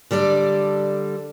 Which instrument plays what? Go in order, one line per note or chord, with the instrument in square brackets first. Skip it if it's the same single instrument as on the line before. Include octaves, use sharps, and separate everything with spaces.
[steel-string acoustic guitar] D3 G3 A4 D5